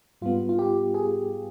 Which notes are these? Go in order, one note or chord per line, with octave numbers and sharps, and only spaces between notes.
G#2 G3 B3 F4
F4
G4
G#4